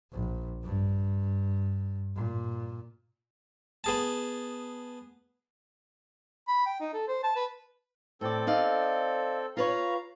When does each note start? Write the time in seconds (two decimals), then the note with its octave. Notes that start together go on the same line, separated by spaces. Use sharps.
0.12 A#1
0.63 G2
2.15 A#2
3.84 B3 G#4 A5
6.48 B5
6.66 G5
6.80 D#4
6.93 A4
7.08 C5
7.23 A5
7.36 B4
8.21 A2 C4 A4 D5
8.47 D#4 D5 F5
9.57 F4 B4 C#5 F5 A#5